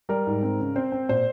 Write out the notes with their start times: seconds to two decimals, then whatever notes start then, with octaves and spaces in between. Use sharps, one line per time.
0.09 G3 A#4
0.27 G#2
0.43 C4
0.60 C#3
0.76 C4 C5
0.92 C4
1.09 A#2 C5